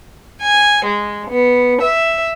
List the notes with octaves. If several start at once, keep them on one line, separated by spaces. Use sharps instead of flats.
G#5
G#3
B3
E5